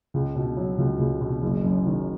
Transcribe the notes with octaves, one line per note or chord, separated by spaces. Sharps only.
C#2
B2
F#3
C#2
C#2
B2
F#1
F#2
D#3